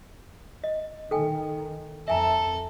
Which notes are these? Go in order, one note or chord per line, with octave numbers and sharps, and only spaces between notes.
D#5
D#3 A4 G5 G#5
F2 A4 E5 G#5 A#5